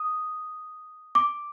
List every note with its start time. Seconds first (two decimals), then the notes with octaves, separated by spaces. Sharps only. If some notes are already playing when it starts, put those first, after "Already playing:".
Already playing: D#6
1.15 D6